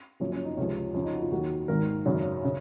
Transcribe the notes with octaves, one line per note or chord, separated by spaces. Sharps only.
F#1 F#2 F3 C#4
C#4
D#4
C#2 C3 F3 C#4
F2 C#3 F3 C#4
D#4
F#4
F4
D#2 D#3 F#3 F#4
G#1 G#2 D#3 A#4
G#1 F#2 C#3 F#3
C#3